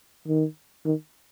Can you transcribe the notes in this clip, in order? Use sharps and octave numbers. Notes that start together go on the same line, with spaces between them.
D#3
D#3